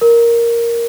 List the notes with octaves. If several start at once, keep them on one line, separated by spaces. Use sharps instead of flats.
A#4